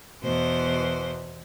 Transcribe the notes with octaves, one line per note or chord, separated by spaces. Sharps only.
E2 B2 C5